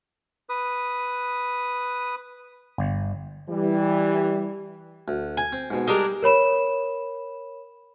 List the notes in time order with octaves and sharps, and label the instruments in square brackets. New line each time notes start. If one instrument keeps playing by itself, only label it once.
[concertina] B4 D#6
[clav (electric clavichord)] G1
[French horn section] E3 G3
[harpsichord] D2
[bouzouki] G#5
[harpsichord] C4
G#2 B2
[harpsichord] G3 [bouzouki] G#3 D4 A#4
[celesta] A#4 C#5 B5 E7